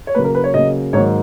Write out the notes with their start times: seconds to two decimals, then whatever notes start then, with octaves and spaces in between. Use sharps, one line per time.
0.07 C#5
0.15 C#3 F#3 A#3 B4
0.24 A#4
0.35 B4
0.44 C#5
0.54 C#3 F#3 A#3 D#5
0.93 G#2 D#3 F#3 A#3 C#5